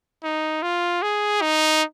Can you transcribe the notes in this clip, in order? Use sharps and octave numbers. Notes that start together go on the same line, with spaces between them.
D#4
F4
G#4
D#4